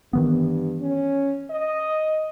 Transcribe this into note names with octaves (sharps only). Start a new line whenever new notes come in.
G2 D#3 E3 B3
C#4
D#5